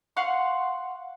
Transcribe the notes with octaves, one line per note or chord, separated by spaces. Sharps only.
F5 F#5 C6 C#6